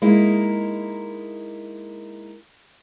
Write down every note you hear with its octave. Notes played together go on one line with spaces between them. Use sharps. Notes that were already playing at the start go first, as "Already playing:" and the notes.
G#3 A#3 D#4 E4